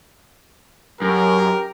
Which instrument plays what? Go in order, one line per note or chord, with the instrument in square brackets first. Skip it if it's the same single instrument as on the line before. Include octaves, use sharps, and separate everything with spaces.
[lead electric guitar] F#2 [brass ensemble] G4 A#4